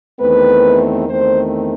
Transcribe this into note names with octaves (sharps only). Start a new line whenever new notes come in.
E2 D#3 A3 C4 B4
E2 D#3 A3 C4 C5